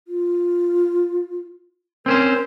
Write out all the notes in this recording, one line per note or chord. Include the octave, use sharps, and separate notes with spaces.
F4
C4 C#4 A#4 C5